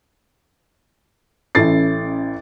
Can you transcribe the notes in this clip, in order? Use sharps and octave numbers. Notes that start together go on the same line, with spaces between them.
A1 C#4 E4 A4 A6 C7